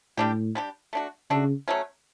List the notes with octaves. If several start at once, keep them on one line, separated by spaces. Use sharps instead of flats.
A2 G3 D4 G4
G3 D4 G4
A3 D4 F#4
C#3 A3 D4 F#4
F#3 A3 C#4